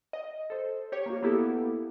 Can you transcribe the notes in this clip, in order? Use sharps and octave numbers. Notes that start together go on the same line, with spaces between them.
D#5
A4 C5
G4 C#5
A#3 F#4
A#3 B3 E4 G4 A4